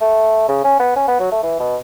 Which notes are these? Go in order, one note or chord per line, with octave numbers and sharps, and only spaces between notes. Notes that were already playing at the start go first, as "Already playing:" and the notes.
A3
C#3
C#4
B3
C#4
B3
F#3
A3
E3
B2